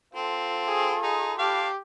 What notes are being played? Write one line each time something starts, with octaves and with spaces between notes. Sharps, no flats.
C4 F4 A4 C6
G#4
D#4 G#4
D4 G4 F5